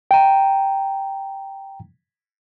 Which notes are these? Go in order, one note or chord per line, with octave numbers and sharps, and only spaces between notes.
G5 A#5